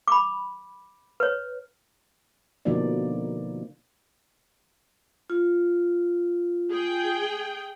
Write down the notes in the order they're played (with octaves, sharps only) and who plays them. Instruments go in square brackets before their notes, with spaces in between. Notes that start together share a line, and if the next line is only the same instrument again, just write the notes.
[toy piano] B5 D6
B4 C#5
[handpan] B2 D3 F3 A#3 D#4 D5
[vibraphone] F4
[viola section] G#4 G5